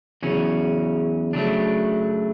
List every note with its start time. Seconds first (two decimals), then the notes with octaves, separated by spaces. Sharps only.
0.23 E2 C#3 F#3 C#4
1.33 C#3 F#3 A3 D4